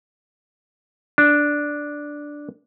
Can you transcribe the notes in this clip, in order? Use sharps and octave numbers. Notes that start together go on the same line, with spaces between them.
D4